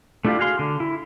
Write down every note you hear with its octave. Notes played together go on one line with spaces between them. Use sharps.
A3 D4 E4 F4 G4
F#4 G#4 F5 C6
D3
E4